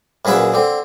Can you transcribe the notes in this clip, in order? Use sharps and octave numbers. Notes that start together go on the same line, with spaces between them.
A#1 F#2 G#4 B4 E5
D3 C4